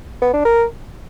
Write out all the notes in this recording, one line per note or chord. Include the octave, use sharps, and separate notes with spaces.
B3
D4
A#4